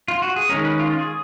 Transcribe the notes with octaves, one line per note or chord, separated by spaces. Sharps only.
F4
F#4
G#4
D#3 G#3 C#4 A#4
B4
F4
F4
G#4